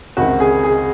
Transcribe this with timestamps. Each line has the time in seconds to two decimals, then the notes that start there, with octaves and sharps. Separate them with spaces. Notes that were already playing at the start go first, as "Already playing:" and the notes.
0.17 C#2 C3 D#3 F#4
0.40 G#4
0.63 G#4